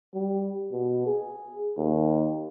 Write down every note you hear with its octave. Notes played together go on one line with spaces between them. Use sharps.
G3
B2
G#4
D#2